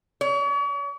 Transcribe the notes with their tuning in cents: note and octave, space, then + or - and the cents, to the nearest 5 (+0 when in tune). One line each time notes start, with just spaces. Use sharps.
C#5 +40